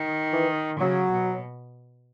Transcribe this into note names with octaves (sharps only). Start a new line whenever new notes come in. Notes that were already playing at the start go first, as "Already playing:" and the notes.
Already playing: D#3
E3
C#3 F#3
B2